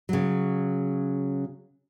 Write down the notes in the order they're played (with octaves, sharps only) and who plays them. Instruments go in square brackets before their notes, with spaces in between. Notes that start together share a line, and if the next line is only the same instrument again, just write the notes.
[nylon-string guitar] C#3 F#3